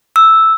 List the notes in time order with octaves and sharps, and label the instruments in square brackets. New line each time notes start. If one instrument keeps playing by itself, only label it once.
[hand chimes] E6